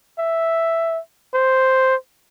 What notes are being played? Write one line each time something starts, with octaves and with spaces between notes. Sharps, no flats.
E5
C5